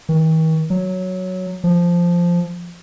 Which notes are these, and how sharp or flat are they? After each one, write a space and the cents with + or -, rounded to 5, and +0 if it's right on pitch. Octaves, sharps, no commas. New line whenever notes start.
D#3 +45
F#3 +0
F3 -5